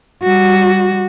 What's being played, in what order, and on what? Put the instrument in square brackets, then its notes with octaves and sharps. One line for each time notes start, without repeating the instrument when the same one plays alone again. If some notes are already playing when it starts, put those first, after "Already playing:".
[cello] G3 F#4